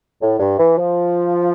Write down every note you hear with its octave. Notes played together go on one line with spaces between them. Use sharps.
A2
G2
E3
F3